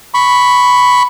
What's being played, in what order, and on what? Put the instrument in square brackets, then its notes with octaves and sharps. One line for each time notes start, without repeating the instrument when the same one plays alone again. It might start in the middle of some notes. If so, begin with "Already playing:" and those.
[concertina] B5 C#6